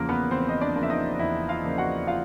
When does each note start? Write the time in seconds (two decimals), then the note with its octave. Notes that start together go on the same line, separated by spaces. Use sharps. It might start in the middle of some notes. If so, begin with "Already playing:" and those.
Already playing: E2 C#3 F3 A#3 A#4
0.09 B3 B4
0.31 E2 C4 C5
0.49 D#5
0.61 D4 D5
0.75 C#3 F3 A#3
0.83 E5
0.90 D#4 D#5
1.19 E2 E4 E5
1.49 F4 F5
1.64 C#3 F3 A#3
1.78 F#4 F#5
2.07 F4 F5